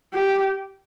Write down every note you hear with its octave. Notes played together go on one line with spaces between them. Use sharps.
G4